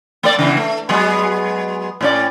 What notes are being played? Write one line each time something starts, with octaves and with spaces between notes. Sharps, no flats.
A3 D5
C#3 E3 B3
A3
F#3 G#3 B3
A2 C#4 D5